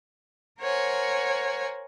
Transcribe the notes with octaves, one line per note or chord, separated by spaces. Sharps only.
A#4 C5 C#5 F#5 G#5